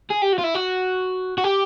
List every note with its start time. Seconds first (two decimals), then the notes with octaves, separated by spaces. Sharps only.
0.10 G#4
0.22 G4
0.33 F#4
0.39 F4
0.44 E4
0.55 F#4
1.38 F#4
1.44 G4